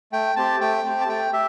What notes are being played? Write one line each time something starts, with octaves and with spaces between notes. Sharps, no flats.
A3 G5
C4 G4 A5
A3 G5
C4 G4
A5
A3 G5
G4 E5